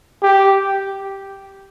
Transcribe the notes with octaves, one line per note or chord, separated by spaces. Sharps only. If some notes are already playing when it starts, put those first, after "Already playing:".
G4